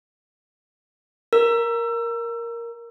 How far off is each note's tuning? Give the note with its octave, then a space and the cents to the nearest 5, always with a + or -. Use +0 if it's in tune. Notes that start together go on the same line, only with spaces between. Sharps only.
A#4 +0 E6 +25